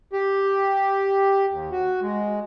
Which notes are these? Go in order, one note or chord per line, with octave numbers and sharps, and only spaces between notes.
G4
D#2
F#4
G#3